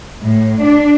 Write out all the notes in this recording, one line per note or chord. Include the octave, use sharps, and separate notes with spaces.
A2
D4